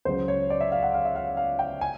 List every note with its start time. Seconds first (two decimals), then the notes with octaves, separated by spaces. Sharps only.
0.05 C#2 C#3 F#3 C5
0.28 C#5
0.50 D5
0.61 E5
0.72 F5
0.82 F#5
0.94 F5
1.05 E5
1.16 F5
1.37 F5
1.59 G5
1.81 G#5